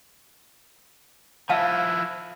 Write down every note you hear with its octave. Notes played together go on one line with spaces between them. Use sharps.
F3 E4 E5 F5 A5